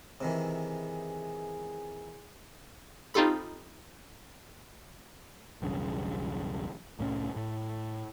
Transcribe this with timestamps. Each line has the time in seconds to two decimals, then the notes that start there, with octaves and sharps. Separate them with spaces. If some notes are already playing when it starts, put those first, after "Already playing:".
0.21 C3 D#3 E3 G#4
3.14 C4 D#4 F4 G4 A4 B5
5.62 B1 E2 G2 C#3
6.99 C2 A2 F#3 C#4
7.36 A2